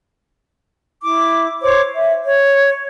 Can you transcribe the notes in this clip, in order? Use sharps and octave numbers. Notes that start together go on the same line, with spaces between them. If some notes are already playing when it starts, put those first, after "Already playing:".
E4 D6
C5 C#5 D6
E5
C#5